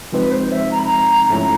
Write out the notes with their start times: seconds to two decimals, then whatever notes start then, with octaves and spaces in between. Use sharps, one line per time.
0.12 C3 F3 G#3 C4 D#4 B4
0.32 C5
0.51 E5
0.71 A#5
0.79 B5
0.85 A#5
1.29 G#2 F3 A3 C#4 E4 A#5